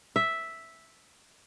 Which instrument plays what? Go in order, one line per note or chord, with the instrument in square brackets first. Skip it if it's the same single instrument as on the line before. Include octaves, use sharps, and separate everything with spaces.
[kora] E5